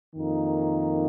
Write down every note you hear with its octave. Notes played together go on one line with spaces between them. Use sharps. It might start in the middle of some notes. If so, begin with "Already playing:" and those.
F2 D#3 A#3 D#4